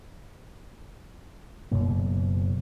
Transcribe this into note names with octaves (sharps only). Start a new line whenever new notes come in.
F#1 F#2 B2 A#3